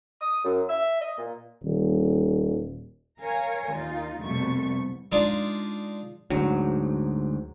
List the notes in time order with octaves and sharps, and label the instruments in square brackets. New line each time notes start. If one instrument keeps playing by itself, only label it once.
[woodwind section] D#6
F#2
E5
D#5
A#2
[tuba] D#1
[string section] A#4 C#5 F5 G#5 A#5
D#2 D#4 F4
C2 F2 B2 A3 C#6
[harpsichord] G#3 D4 D#4 F4
[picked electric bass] D2 G#2 [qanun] F#3